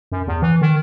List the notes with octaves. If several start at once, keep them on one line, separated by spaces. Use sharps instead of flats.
F#2
E2
E3
D#3